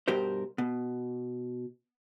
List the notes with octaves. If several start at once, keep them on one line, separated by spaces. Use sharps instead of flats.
G2 B2 G4 A#4 C5
B2